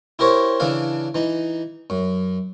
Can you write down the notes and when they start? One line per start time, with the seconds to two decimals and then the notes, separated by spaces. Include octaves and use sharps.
0.19 E4 G4 A#4 C5 C#5
0.60 C#3 E3 D4 A4 F5
1.15 E3 D#4
1.90 F#2